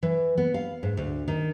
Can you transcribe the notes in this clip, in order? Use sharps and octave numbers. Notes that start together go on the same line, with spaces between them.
E3
B3
F5
G#2
D2
D#3